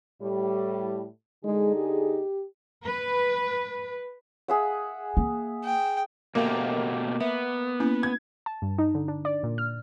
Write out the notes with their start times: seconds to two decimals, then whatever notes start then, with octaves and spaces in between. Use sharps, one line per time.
0.22 A2 G3
1.44 D3 G#3 D#4 G#4
1.75 G4
2.85 B4
4.48 G#4 E5 F#5
5.17 A#3
5.64 G5
6.35 B2 A3 A#3 G4
7.21 B3 E5
7.80 A#3 C#4 E4
8.03 G#6
8.46 A5
8.62 G2
8.78 D#4
8.95 D3
9.08 D4
9.25 D5
9.43 A#2
9.58 F6